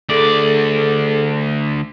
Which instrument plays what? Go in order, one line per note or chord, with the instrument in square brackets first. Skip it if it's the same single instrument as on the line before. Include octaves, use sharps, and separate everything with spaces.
[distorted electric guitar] D2 D5 [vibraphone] G#4 A4